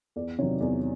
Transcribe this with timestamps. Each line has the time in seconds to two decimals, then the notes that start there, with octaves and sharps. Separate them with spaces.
0.16 E2 D5
0.38 C3 D#3 F#3 C#5
0.60 E2 D5